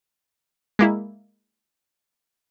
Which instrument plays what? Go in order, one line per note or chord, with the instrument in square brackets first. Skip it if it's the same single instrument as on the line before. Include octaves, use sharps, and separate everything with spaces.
[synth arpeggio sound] G#3 A#3 E4